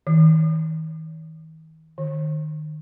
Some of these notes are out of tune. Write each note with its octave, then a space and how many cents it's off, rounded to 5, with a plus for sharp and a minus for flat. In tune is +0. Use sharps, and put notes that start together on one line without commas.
D#3 +40
D#3 -25